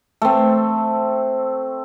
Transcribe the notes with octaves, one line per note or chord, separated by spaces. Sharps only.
A3 C4